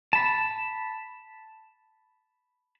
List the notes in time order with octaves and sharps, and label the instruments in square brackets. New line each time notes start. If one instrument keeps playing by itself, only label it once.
[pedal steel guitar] A5 B5